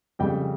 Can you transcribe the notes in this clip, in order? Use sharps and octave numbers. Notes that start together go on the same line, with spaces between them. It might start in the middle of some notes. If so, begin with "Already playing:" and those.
F2 C#3 G3 G5